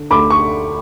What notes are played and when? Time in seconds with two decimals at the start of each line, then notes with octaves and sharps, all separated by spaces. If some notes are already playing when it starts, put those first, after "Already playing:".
Already playing: D3
0.10 D2 B5 D6
0.30 C#6